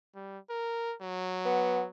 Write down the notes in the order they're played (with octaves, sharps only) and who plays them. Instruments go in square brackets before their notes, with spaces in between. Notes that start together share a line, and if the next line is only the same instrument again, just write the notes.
[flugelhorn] G3
A#4
F#3
[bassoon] B3